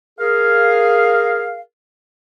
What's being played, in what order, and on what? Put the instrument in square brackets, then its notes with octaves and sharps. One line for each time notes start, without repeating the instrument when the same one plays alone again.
[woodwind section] G#4 A#4 F5